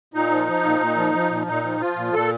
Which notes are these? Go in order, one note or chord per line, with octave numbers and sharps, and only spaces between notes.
A#2 D#4
F3
F3
A#2
A#2
F3
F3
A#2
A#2 D#4
F3
F3 F4
A#2
A#2 A4